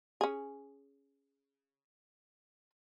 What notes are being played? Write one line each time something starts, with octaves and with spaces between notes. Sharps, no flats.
C#4 G#4